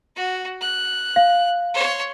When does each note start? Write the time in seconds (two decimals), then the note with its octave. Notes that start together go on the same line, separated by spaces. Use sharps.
0.16 F#4
0.61 F#6
1.16 F5
1.74 C#5 C6